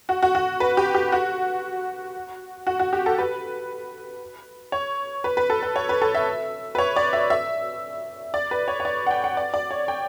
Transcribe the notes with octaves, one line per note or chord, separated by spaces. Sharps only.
F#4
F#4
F#4
B4
G4
G4
F#4
F#4
F#4
G4
A4
B4
C#5
B4
B4
A4
B4
C#5
B4
A4
E5
B4
C#5
D5
E5
E5
D5
B4
C#5
C#5
D5
F#5
G5
F#5
D5
D5
C#5
G5